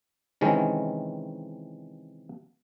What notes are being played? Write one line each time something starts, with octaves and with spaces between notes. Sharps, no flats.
C3 D#3 E3 G#3 C#4